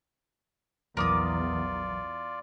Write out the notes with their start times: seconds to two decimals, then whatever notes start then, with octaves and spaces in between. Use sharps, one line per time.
0.97 A#1 E2 F#3 F4 A#4 D5 D6 D#6